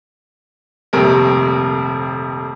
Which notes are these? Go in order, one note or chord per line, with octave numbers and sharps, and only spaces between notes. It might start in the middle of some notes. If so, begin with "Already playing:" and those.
D#1 F2 C3 A3 A#4